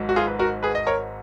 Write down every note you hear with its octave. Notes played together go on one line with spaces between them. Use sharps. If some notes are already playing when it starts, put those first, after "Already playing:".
Already playing: G#1 G#2 F#3
F#4
F4 G#4
B4
F#4 A#4
G#4 B4
D#5
A#4 C#5